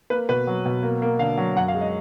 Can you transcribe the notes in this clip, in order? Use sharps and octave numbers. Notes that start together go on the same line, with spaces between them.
A#3 B4
B2 B4
F#3
B2
A#3
A#3
D3 F5
F#3
F#2 F#5
F5
G#3
D#5